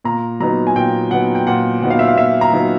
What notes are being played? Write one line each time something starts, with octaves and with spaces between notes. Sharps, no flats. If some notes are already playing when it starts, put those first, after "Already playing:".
A#2 A#5
F#3 B3 D#4 A#5
G#5
A#2 G5
F#3 B3 D#4 F#5
G5
A#2 F#5
F#3 B3 D#4 F#5
F5
E5
F5
A#2 E5
A#5
F#3 B3 D#4